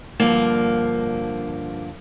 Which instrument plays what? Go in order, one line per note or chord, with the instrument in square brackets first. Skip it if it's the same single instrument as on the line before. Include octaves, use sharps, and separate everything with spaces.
[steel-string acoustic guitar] G2 D3 F3 A#3